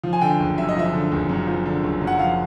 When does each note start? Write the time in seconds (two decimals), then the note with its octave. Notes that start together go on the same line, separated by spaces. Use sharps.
0.03 F3
0.13 G#5
0.21 D3 G5
0.40 F#1
0.58 F#2 E5
0.69 D#5
0.76 F3 E5
0.93 D3
1.12 F#1
1.29 F#2
1.47 F3
1.65 D3
1.83 F#1
2.01 F#2
2.07 F#5
2.19 F3 F5